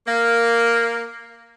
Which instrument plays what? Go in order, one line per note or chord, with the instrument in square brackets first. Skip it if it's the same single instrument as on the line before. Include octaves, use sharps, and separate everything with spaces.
[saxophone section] A#3